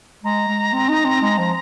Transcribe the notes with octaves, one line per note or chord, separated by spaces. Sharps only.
G#3 A#5
G#3
C4
D#4
C4
G#3
F3